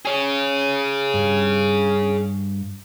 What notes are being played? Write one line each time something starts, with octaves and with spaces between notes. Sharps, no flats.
G#4 C#5
G2